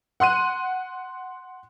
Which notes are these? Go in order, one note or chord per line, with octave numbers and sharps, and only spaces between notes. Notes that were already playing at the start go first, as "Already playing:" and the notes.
F#5 C6 F#6 D#7